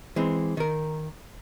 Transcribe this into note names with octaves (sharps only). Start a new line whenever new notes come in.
E3 G#3 C4
D#3 A#4